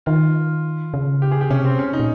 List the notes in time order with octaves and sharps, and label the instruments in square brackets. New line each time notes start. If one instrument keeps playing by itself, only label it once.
[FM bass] D#3 [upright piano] F4
[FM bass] C#3
[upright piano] G4
G#4
G4
[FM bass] C3 [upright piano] C#4
[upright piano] C4
C#4
D#4
[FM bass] A#2